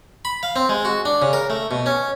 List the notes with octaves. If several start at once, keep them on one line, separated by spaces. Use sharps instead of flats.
B5
F5
C4
G#3
F#4
D4
C#3
A#4
A3
B2
C#4